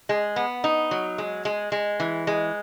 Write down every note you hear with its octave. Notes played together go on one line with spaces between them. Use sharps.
G#3
B3
D#4
F#3
G#3
G#3
G#3
E3
G#3